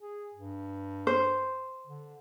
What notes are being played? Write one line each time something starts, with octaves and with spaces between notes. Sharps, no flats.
G#4
G2
C5
D3